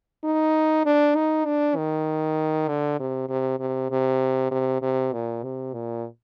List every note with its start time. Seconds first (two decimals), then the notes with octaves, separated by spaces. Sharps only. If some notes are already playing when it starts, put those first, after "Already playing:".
0.24 D#4
0.85 D4
1.15 D#4
1.45 D4
1.76 D#3
2.68 D3
2.99 C3
3.29 C3
3.59 C3
3.90 C3
4.51 C3
4.82 C3
5.13 A#2
5.43 C3
5.73 A#2